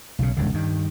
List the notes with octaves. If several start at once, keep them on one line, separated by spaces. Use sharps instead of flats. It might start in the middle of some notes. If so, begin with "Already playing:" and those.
B1 C#3
E1 C#2 G2 D3
G2 D#3